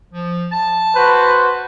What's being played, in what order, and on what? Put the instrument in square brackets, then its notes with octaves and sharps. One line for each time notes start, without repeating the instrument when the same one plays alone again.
[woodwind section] F3
A5
[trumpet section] F#4 B4 C5